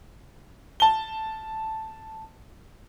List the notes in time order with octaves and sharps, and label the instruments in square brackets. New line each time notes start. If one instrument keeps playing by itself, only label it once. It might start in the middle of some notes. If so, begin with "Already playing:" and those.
[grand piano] A5 G7